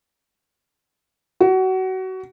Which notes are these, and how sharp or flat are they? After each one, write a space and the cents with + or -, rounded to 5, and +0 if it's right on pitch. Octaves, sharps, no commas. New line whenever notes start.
F#4 +25